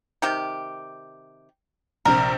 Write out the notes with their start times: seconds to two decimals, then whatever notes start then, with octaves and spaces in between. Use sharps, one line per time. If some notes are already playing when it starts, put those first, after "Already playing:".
0.22 C3 D#3 G4
2.05 A#1 C3 A#4